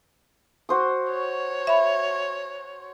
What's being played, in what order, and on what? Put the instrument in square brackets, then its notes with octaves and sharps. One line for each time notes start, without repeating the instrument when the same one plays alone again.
[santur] F#4 C5 D#6
[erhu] C#5
[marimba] E5 B5